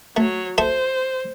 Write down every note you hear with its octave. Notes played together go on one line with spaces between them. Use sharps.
F#3 A3 C#5
A4 C5 E5 C6